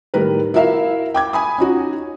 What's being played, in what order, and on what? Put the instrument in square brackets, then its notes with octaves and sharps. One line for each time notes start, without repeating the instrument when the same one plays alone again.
[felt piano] A2 D#3 G3 A#4 B4
E4 F#4 A#4 E5 F5
G5 D6 G#6
G#5 B5 D#6
C#4 D#4 F#4